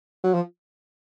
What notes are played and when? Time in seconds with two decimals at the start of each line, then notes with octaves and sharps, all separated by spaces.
0.24 F#3
0.34 F3